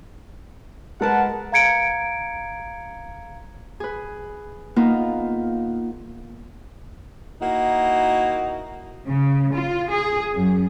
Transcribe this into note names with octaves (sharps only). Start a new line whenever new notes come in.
G#3 A#4 B4 F#5 A5
F5 A#5 G#6 C#7 D7
G#4 B4
A#3 B3 D#4 F4
A#3 D#4 E4 F#4
C#3
F4
G#4
F#2